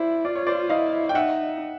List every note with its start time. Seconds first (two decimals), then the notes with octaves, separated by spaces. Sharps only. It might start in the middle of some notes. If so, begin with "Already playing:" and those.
Already playing: E4 C5 D5
0.25 F4 D5
0.35 C#5
0.47 C5 D5
0.69 E4 D#5 F5
1.09 G5
1.15 D#4 E5 F#5